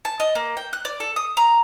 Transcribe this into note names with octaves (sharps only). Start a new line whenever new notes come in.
A5
D#5
A#3
G5
F#6
D5
A4
D#6
A#5